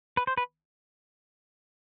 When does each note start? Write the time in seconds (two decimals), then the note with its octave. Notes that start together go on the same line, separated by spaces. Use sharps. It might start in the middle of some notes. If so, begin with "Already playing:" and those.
0.17 B4
0.27 C5
0.37 B4